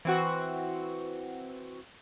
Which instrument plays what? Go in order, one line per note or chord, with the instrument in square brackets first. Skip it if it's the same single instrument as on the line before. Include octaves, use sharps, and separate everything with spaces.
[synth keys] E3 C4 F#4